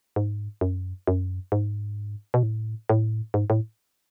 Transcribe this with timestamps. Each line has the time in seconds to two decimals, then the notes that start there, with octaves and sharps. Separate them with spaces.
0.16 G#2
0.61 F#2
1.07 F#2
1.52 G#2
2.34 B2
2.43 A2
2.89 A2
3.34 G#2
3.50 A2